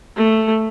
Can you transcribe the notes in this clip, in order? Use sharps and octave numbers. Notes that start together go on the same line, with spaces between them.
A3